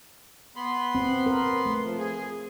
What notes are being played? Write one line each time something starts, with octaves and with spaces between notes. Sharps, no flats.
B3 B5 C6
C4
A#4
A3
F3
G#4